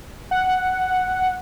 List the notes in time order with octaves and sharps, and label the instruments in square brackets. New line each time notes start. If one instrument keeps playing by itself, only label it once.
[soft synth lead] F#5